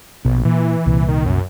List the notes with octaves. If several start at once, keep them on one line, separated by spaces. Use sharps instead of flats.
A#1 B2
A#2 E3
C2 A#2
D#3
F#2